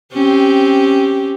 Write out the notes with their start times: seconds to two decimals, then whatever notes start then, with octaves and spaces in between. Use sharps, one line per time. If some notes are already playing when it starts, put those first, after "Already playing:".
0.12 C4 C#4 G4